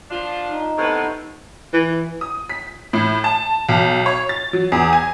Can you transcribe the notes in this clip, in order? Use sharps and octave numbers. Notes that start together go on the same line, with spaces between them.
F3 D4 F4
D#4
A2 C3 B3
E3
D#6
B6
A2
A5
B1
C#5
A6
F#3
E2
G#5